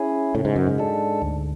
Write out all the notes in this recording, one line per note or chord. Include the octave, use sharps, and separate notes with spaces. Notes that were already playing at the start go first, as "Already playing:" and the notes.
Already playing: C#4 E4 G#4
A2 C#3
G#2
F#2
G#2
G#3 D4 A4
D2